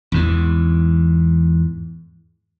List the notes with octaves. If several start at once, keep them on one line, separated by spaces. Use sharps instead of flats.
E2 G#2 E3